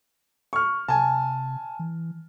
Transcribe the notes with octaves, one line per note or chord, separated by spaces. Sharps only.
C#6 F6
C3 G#5 A5
E3